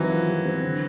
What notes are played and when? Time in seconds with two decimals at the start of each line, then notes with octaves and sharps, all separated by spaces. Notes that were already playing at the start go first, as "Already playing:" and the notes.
Already playing: D#3 E3 F#3 G3 C4
0.10 F4
0.27 G3
0.45 C4
0.63 D3